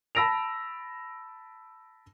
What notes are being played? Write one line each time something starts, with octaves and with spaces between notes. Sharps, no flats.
A5 B5 E6 A#6 D7 F7